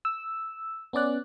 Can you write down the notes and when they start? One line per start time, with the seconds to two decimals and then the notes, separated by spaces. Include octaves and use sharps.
0.05 E6
0.93 B3 C#4 D5 F#6